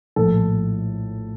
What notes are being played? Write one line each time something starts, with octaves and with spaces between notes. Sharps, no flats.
A#1 A2 A4